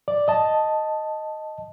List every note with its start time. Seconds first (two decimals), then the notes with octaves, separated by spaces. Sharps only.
0.08 D5
0.28 D#5 A5